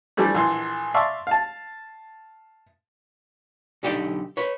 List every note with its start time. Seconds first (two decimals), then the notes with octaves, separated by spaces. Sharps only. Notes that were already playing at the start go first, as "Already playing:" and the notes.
0.17 E3 F3 G3 A3 D4
0.34 A#1 E3 C6
0.94 D5 E5 F5 A5 C6 C#6
1.27 F5 A5
3.83 B1 D3 D#4 G4 D5 G5
4.37 B4 C#5